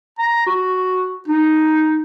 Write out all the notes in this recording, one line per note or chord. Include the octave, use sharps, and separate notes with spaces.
A#5
F#4
D#4